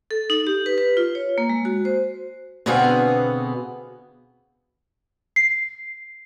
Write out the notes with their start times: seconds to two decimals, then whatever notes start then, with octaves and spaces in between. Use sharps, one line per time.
0.11 A4
0.30 D#4
0.47 G4
0.66 B4
0.78 B4
0.97 F4
1.15 C#5
1.38 A#3
1.50 G#3
1.65 F#4
1.85 C5
2.66 B2 D3 B3 C4 G#4 F5
5.36 C7